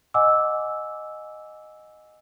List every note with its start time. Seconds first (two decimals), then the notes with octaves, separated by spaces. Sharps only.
0.14 D#5 F#5 G#5 D6 E6